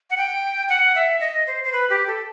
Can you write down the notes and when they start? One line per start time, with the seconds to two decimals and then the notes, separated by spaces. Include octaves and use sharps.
0.10 F#5
0.17 G5
0.69 F#5
0.95 E5
1.20 D#5
1.47 C5
1.64 C5
1.72 B4
1.90 G4
2.07 A4